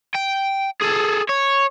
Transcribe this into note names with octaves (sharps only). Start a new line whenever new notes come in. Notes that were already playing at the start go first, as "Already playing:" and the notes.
G5
G#4 A4
C#5